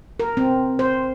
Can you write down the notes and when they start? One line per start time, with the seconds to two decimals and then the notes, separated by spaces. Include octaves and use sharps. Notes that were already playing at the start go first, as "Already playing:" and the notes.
0.20 A#4
0.37 C4
0.79 C5